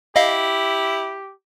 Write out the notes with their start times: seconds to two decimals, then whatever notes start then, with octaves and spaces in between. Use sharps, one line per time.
0.16 E4 G4 D#5 F5